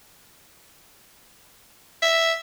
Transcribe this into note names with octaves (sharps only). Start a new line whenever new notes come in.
E5